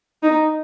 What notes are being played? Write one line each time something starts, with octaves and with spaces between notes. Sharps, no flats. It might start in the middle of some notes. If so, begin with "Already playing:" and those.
D#4